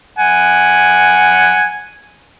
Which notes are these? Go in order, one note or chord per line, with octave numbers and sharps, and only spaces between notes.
F#5 G#5